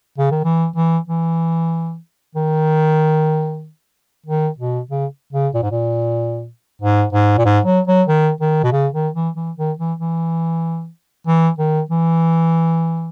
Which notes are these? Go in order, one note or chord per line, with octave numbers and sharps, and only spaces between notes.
C#3
D#3
E3
E3
E3
D#3
D#3
B2
C#3
C#3
A#2
G#2
A#2
G#2
G#2
A#2
G#2
F#3
F#3
D#3
D#3
B2
C#3
D#3
E3
E3
D#3
E3
E3
E3
D#3
E3